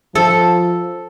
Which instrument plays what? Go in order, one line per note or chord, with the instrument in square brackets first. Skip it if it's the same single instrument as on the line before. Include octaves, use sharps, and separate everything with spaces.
[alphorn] F3 [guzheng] A4